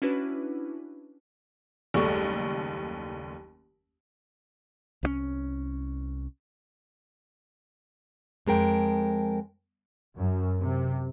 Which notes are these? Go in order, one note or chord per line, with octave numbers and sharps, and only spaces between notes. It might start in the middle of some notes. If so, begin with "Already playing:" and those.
C#4 D4 E4 F#4 B4
F#1 D#2 G3 A3 C#6
C2 E3 C#4
F2 G#3 A#4 G5
F#2
C3